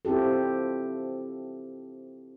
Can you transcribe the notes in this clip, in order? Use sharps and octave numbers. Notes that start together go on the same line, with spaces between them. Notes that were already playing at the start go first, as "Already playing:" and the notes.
C4 E4 F4 G4 A4